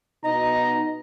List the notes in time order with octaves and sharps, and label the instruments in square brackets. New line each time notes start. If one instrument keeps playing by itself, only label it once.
[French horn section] B2 D#4 [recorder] D#5 [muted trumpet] A#5